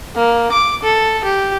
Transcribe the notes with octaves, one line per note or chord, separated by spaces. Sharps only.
A#3
D6
A4
G4